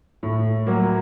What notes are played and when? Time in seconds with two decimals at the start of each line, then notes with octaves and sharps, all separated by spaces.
0.23 A2
0.67 F#3 A#3